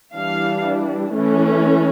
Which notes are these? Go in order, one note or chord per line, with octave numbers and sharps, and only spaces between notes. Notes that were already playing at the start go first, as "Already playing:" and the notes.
E3 G3 D4 F5
E3 A3 C#4